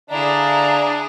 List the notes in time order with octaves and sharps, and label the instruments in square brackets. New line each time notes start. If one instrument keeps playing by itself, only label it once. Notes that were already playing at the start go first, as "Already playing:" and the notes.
[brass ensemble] D3 D5 F5 [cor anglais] D4 [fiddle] E4 G#4 [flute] A#5